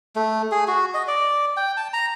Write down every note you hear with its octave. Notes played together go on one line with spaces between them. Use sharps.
A3
G#4
F#4
D#5
D5
G5
A5
A#5